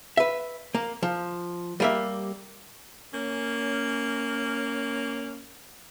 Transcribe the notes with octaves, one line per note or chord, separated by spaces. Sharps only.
B4 E5
A#3
F3
G3 A#3 E5
A#3 C#4